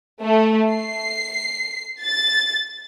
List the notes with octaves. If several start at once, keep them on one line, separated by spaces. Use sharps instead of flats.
A3
C7
A6